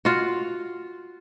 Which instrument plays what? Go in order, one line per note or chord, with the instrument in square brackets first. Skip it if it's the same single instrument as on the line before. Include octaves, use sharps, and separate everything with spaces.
[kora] F4 F#4